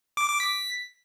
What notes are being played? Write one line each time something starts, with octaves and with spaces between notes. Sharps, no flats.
D6
D6
B6